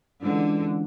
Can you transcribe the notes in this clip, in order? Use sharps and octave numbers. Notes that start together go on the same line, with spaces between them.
D3 E3 G#3 C#4 F4